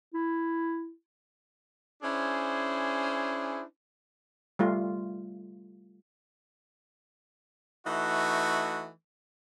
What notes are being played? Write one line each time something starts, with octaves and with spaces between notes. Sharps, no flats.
E4
C#4 D4 E4 G#4 C5
G3 A3 F4
E3 A3 D#4 F#4